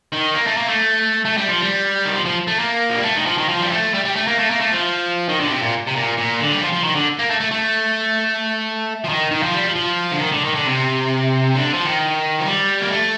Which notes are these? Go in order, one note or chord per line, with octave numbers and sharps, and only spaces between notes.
D#3
A#3
A3
A#3
A3
A3
G3
F3
G3
D#3
F3
F3
A3
A#3
F3
G3
A3
D#3
F3
D#3
F3
G3
A3
G3
G3
A3
A#3
A3
A#3
A3
F3
D#3
D3
A#2
C3
A#2
C3
A#2
A#2
D3
G3
F3
F3
D#3
D3
A#3
A3
A3
A3
F3
D#3
D#3
F3
G3
F3
F3
D3
D#3
D3
D#3
D3
C3
D3
F3
D#3
F3
G3
A#3
A3